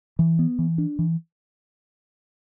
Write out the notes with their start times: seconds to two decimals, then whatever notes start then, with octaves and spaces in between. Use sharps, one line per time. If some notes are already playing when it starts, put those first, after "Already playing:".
0.19 E3
0.39 B3
0.59 E3
0.78 D4
0.99 E3